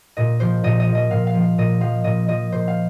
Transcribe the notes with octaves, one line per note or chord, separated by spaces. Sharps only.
A#2 D#5
F3 C5
A#2 D#5
D#5
F3
D#5
A#2 F5
F5
F3
F5
A#2 D#5
F3 F5
A#2 D#5
F3 D#5
A#2 C5
F5